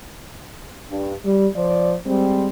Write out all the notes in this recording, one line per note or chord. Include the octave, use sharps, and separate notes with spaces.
G2
G3
F3 C5 D5
G3 G#3 C4